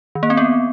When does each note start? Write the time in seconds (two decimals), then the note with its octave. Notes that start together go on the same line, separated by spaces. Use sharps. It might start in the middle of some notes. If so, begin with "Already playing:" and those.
0.15 D#3
0.23 A#3
0.30 C4
0.37 B3